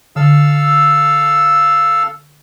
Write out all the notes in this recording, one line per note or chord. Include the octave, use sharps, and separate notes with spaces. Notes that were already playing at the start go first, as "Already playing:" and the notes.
D3 A4 F5 E6